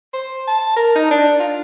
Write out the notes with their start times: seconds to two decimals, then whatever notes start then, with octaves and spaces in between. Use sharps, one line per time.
0.13 C5
0.47 A5
0.76 A#4
0.95 D#4
1.11 D4
1.40 F4